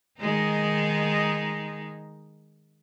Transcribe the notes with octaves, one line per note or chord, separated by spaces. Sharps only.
D#3 G#3 D#4